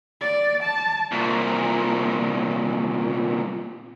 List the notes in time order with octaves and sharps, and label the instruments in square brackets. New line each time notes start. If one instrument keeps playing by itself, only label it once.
[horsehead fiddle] D5
A5
[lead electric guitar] C2 A#2